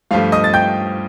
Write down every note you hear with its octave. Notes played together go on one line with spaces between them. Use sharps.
G2 F3 A3 F4 F5
D#5 D#6
A6
G5 G6